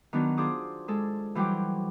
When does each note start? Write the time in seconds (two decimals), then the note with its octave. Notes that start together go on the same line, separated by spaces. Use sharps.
0.13 D#3 F#3 B3 D4 D#4
0.37 D4 F4 G#4 C5 D6 D#6
0.88 G#3 G#4 A4
1.35 E3 F#3 G3 C5 G5 D6